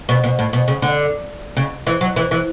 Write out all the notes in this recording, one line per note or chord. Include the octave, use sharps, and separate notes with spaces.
B2
B2
A2
B2
C#3
D3
C#3
E3
F#3
E3
E3